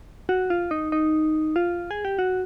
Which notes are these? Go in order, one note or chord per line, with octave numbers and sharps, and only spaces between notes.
F#4
F4
D#4
D#4
F4
G#4
G4
F#4